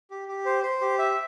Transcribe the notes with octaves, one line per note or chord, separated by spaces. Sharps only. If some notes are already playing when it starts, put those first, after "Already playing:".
G4
G4
C5
C5
G4
E5